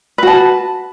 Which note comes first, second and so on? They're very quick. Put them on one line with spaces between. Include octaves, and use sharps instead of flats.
B4 F#4 A5